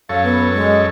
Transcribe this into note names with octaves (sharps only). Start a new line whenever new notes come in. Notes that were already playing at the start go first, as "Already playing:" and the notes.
F#2 A4 C#5 F5
B3
G#3